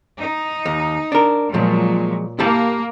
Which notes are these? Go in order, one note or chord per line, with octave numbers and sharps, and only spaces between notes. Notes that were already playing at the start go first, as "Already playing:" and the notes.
D#4
D#2
D4 A#4
A#2 F3 F#3 G#3
A#3 E4 G4 A5